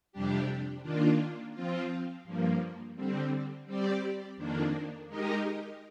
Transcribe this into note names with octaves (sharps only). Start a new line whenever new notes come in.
F2 C3 G3 D4 G4
D#3 A#3 D4 F4
F3 C4 F4
G2 F3 A#3
D3 G3 C4
G3 C4 G4 D5
F2 D#3 A#3 D4
G#3 D#4 G4 A#4 D#5